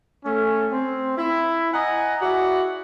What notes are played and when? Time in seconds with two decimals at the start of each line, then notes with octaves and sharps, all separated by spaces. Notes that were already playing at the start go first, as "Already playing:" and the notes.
0.25 A3 C#4
0.72 C4
1.17 E4
1.73 D#5 F#5 G#5 A#5
2.21 E4 F#4 G#4 D5